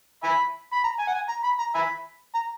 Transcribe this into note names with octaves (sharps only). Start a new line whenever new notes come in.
E5 G#5 B5
B5
A#5
G#5
F#5
G#5
A#5
B5
A#5
E5 G#5 B5
A#5